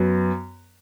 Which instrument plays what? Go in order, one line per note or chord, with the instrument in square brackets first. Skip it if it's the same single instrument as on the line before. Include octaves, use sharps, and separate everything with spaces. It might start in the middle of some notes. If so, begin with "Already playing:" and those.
Already playing: [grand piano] F#2 F#3 B3